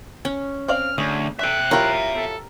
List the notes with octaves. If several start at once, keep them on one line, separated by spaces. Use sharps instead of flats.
C#4
C4 D5 F5 F6
D2 G#4 C#5
D4 A4 E5 G5 F#6
F#3 E4 F4 G4 A#4
A4